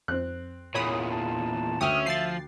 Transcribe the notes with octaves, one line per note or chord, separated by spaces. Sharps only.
F2 C4 F#6
E2 A#2 C#5 B5 D#6
A5
D2 C#4 E5 G5 D#6 F6
F3 A6 C7